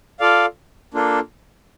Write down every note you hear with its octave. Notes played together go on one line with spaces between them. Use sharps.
F4 A4 D5 F5
A#3 D4 F4 A4